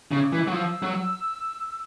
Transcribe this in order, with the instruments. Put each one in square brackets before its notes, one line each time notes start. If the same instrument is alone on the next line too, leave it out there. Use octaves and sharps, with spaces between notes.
[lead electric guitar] C#3
[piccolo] D6
[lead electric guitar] E3
F#3
[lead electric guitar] F3 [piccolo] E6
[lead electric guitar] F#3